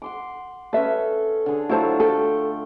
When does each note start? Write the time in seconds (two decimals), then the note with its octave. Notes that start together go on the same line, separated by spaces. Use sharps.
0.02 F#5 C6 D6
0.73 C#4 A4 B4 E5
1.46 D3 G#4
1.69 F#3 A3 E4 F4 C5 A5
2.00 A4 G5